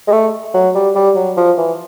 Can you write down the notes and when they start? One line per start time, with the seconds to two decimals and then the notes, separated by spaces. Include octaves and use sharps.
0.08 G#3
0.12 A3
0.54 F#3
0.75 G3
0.96 G3
1.15 F#3
1.37 F3
1.58 E3